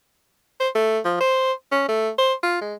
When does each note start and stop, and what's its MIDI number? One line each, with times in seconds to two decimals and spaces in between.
0.60 0.70 72
0.76 1.00 57
1.05 1.18 53
1.20 1.52 72
1.72 1.84 61
1.89 2.10 57
2.19 2.34 72
2.43 2.60 65
2.61 2.75 56